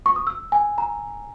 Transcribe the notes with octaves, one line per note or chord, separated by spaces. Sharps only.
C#6
D#6
E6
G#5
A#5